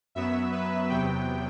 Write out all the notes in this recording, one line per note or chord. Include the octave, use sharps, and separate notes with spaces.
F#2 F#3 B3 E5
B4
E2 C3 F#3 B3 G5